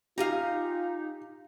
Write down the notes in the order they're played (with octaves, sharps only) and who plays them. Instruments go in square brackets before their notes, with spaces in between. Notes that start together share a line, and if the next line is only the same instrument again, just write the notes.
[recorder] D#4 [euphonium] F4 [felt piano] G4 [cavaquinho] F5 G#5 A#5